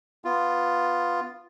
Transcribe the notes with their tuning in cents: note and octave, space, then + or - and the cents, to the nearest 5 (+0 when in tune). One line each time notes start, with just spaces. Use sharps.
B3 +0 F4 +0